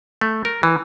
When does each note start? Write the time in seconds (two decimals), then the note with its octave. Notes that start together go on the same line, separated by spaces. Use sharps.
0.21 A3
0.45 A#4
0.63 E3